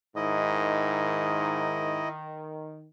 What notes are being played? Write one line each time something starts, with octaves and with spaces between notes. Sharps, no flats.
G#2 D#3 E4 D#5